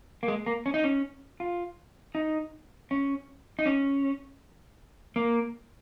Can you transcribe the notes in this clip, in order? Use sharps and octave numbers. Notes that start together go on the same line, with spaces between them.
A#3
G#3
A#3
C#4
D#4
C#4
F4
D#4
C#4
D#4
C#4
A#3